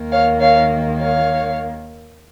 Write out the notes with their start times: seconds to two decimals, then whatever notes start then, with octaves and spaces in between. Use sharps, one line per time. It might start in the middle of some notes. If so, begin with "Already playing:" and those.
Already playing: D#2 D#3 A#3
0.12 C#5 F5
0.41 C#5 F5
0.99 C#5 F5